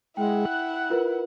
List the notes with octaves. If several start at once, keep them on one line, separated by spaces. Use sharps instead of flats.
G#3 E4 F#5 G5
F#6
F4 A#4 B4